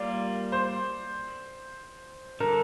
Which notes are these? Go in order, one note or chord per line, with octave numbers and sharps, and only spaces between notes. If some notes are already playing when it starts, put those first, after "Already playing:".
Already playing: G3 A#3 F4 D5
C5
D3 G3 D4 A4 A#4